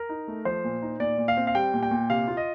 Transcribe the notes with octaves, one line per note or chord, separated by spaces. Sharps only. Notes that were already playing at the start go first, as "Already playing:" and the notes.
Already playing: A#4
D#4
A3
F3 C5
A#2
D#4
A#2 D5
A#2
F5
C4
F5
G3 G5
A#2
G5
A#2
C3 F5
F4
D#5